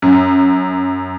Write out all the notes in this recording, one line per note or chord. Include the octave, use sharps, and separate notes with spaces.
F#2